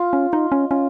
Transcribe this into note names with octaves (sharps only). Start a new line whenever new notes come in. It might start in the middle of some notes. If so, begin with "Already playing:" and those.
Already playing: F4
C#4
D#4 D#5
C#4
C#4 F4